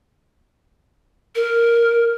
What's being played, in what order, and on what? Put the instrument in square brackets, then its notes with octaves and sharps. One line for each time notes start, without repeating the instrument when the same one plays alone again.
[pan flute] A#4